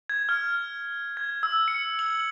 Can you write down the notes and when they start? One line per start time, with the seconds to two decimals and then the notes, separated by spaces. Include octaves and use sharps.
0.09 G#6
0.29 F6
1.17 G#6
1.43 E6
1.68 C#7
1.99 F#7